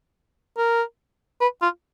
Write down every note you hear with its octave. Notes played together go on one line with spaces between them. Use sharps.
A#4
B4
F4